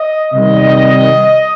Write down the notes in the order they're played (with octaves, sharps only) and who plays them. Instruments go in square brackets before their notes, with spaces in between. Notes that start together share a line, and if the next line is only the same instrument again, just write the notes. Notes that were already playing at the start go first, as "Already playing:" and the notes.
Already playing: [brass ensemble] D#5
C3 D#3 G3 D#5